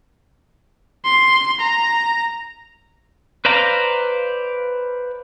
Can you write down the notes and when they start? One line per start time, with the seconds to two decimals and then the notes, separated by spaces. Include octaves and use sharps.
1.05 C6
1.60 A#5
3.45 B4 C5 D5 F5 A#5